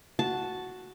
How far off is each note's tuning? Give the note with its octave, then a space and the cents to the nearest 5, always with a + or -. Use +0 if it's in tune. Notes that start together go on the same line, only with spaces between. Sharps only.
F#4 +0 A5 -5